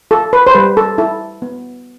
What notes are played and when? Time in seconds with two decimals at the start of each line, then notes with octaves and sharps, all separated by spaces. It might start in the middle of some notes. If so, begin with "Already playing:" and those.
0.11 F4 A4
0.33 B4
0.47 C5
0.55 G3 B4
0.77 A4
0.98 E4 A4
1.42 B3